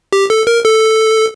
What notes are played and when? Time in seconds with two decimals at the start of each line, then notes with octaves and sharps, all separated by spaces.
0.13 G4
0.30 A4
0.47 A#4
0.65 A4